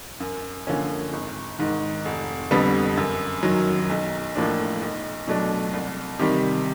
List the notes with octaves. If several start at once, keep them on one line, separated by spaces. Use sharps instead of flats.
F#2
D3 F3 A#3 C#4
G#1
G#2 D#3
F1
F2 D3 G3 B3
F#2
D#3 F#3
B1
A2 F3 A#3 D4
B1
B2 F#3 A3 D4
C2
C3 D#3 G3